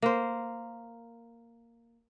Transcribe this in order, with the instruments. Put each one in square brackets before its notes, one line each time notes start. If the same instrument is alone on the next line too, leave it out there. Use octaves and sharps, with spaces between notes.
[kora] A#3 C5